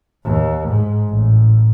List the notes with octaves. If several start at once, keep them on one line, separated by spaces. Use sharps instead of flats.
D#2
G#2
A1